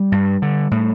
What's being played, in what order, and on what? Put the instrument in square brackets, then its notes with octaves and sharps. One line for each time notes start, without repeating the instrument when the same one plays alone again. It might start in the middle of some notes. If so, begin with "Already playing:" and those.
Already playing: [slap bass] G3
G2
D3
A2